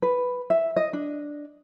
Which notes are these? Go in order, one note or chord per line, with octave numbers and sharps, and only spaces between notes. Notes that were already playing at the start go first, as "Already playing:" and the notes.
B4
E5
D#5
D4